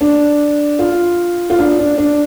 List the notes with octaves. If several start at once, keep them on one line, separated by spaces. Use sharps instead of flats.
D4
F4
F4
D4
D4
D4